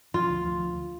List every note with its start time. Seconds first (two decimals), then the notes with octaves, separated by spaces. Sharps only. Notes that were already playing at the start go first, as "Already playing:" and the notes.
0.14 F3 F4
0.30 D2
0.45 F3
0.61 D2